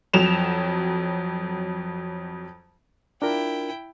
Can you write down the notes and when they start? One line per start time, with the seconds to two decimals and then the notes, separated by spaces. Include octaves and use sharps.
0.13 F2 F#3 E7 F7
3.22 D4 E4 F4 A#4 G5